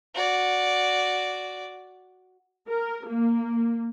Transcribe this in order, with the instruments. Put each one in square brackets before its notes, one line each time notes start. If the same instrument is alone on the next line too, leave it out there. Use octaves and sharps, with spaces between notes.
[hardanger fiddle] F#4 D5
[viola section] A#4
A#3